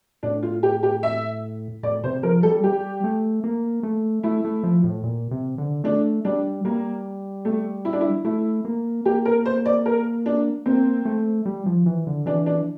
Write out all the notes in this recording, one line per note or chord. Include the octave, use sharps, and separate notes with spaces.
A2 D4
F4
G4
G4
E5
A2 D5
C3 C5
F3 A#4
G3 A4
G3 G4
A3
A#3
A3
A3 E4
A3
F3
A2
A#2
C3
D3
A3 D4
G3 D4
G3 A#3
A3
E4
D4
E4
A3 E4
A#3
A#3 G4
A#4
C5
D5
A#4
D4
A#3 C4
A3
G3
F3
E3
D3
E3 D4
D4